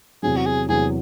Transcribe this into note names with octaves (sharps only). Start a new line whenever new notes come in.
E2 C3 F#3 G#4
F#4
G#4
E2 C3 F#3 G#4